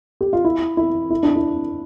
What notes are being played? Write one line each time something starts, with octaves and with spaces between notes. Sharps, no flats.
G4
F4
E4
E4
E4
D4
E4